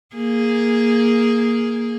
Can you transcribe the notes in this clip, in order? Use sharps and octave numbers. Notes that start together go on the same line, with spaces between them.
A#3 G#4